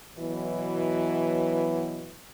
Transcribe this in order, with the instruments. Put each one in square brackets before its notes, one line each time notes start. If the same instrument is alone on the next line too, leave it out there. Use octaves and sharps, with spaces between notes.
[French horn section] B2 E3 F#3